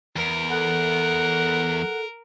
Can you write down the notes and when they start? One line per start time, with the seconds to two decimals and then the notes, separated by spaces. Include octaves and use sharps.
0.16 E2 A#4
0.50 A4 F#5